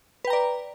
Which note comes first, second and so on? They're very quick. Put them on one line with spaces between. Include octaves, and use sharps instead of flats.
B4 G5 A#5 D5